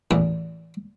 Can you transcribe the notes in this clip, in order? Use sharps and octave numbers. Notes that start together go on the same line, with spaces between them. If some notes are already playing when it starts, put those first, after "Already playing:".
A1 E2